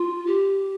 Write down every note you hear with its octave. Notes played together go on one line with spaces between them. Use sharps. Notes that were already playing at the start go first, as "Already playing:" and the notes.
Already playing: F4
G4